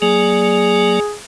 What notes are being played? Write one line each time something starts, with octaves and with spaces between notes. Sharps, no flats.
F#3 A#3 G#4 D5